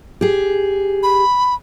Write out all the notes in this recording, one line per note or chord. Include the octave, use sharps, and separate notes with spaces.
G4 G#4
B5